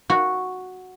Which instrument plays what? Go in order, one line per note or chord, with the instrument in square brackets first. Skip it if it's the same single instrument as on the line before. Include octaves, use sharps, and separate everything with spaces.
[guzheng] F#4